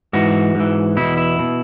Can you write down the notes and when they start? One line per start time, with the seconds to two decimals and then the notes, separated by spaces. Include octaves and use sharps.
0.13 G#2 E3 F#4
0.55 G#2 E3
0.97 E2 B2 E4
1.17 E4
1.39 B2